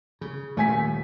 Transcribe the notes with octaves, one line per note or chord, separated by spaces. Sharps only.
C#3
D#1 D#3 A3 G#5 B6